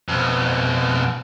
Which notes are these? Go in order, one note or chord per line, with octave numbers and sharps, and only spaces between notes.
F2 B2